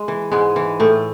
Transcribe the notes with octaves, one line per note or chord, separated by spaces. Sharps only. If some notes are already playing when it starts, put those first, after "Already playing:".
Already playing: G#3
E3
G#2 G#3
E3
A2 A3